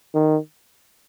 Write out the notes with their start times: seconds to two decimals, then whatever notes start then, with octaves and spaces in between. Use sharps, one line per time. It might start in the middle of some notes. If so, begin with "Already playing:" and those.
0.14 D#3